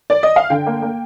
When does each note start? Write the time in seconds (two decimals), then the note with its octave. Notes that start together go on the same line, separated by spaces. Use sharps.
0.10 D5
0.23 D#5
0.36 F5
0.50 D3 G5
0.66 A#3
0.82 A#3